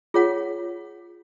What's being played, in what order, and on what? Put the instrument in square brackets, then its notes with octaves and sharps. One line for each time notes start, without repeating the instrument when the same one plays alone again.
[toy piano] F4 G#4 C#5 F#5